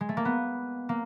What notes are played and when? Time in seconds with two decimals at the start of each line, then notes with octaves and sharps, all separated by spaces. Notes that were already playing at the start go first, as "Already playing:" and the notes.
0.01 G#3
0.09 A3
0.17 A#3
0.25 B3
0.89 A#3